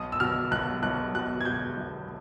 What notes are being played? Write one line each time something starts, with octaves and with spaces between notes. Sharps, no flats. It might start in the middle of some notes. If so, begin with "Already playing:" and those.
Already playing: B1 D#6
E6
B2 F6
B1 F#6
B1 F#6
B2 F#6
G#6
B2 G6
B1